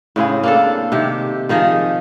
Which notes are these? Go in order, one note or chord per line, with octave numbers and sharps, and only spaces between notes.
A2 C#3 C4 G#4
A#3 D4 A4
C3 D#3 G4
D#3 F3 D#4 G#4